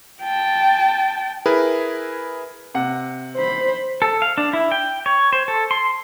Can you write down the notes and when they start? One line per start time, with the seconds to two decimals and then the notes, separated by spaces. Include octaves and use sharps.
0.22 G5 A5
1.46 E4 G#4 A#4 B4
2.75 C3 F#5
3.36 C5 B5
4.02 A4
4.22 F5
4.38 D4
4.53 E4
4.72 G5
5.06 C#5
5.33 C5
5.48 A4
5.71 C6